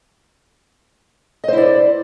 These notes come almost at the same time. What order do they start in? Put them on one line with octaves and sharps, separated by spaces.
D#5 C5 E4 D5